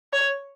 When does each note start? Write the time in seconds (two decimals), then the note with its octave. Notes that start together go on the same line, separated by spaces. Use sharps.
0.13 C#5